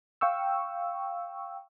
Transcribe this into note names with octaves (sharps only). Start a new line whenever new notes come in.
F5 G5 C#6 E6